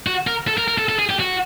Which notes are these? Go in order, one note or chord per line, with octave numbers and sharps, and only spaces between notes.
F#4
A#4
A4
A#4
A#4
A4
A4
G#4
G4
F#4